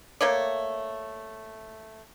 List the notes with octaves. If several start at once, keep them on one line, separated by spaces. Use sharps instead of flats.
A3 A#3 C#5 D5